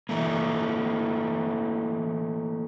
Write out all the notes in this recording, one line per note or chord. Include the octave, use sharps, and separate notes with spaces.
E3 A3 A#3